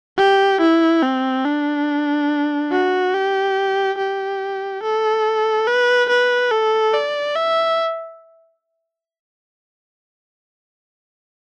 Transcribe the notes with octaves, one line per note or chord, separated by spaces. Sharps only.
G4
E4
C4
D4
F#4
G4
G4
A4
B4
B4
A4
D5
E5